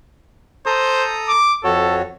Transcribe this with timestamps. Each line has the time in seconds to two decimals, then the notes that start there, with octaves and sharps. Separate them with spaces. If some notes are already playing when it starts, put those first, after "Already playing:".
0.66 A4 C5 A#5 D#6
1.29 D6
1.64 F2 F#4 A4 C#5